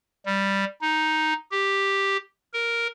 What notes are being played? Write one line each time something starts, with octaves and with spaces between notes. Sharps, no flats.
G3
D#4
G4
A#4